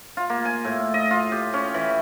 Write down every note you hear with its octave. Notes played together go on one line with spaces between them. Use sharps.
F4
A#3
G#5
A2
D#5
F4
G4
C#4
E3